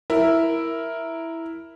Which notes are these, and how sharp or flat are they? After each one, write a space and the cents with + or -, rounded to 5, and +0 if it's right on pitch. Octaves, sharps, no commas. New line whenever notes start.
E4 +0 A#4 +0